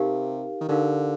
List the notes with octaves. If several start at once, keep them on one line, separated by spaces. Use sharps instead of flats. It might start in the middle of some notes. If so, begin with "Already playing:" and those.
Already playing: C3 D#4 G4 A#4 F5
D#3
D3 D#4 G4 A#4 F5